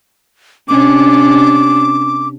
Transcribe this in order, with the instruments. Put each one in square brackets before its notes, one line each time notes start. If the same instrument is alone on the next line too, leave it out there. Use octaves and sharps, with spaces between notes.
[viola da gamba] C3 C#4 D4 [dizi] D6